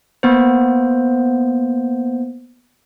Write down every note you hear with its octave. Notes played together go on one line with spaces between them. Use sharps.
A#3 B3 C5